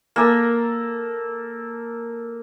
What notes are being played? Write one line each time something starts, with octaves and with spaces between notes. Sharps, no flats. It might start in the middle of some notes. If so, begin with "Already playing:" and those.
A#3 A4 A#5